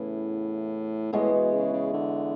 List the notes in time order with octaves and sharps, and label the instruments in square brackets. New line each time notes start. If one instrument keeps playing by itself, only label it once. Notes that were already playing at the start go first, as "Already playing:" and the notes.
Already playing: [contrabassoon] A2 [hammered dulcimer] C#3 E3 B3
[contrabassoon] A2 [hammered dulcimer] E3 G#3 B3 F#4
[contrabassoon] B2
C#3
C#3
D3